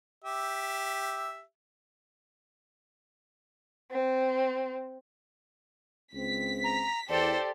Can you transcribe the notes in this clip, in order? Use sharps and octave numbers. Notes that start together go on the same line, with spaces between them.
G4 E5
C4
C#2 C4 B6
A#5
E2 G4 A4 C5 D5